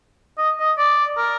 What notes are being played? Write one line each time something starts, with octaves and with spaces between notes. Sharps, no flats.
D#5
D#5
D5
A#4